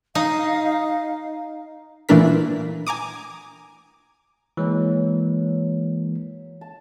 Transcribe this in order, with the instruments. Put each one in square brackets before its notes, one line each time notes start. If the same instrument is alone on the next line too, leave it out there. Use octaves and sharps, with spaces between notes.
[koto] D#4 [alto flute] F5
[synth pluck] A#2 E3 A3 D4 A#4 B6
G#5 A#5 D6 D#6
[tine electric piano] E3 G#3 A#3 [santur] F#3 G#5
[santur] A5